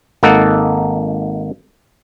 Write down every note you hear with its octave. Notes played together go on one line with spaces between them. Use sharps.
G#1 A#3 D#4 A4 F#5